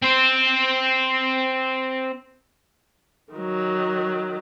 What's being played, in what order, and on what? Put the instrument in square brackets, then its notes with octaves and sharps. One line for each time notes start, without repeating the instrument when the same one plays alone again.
[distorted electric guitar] C4 C5
[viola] D#3 F#3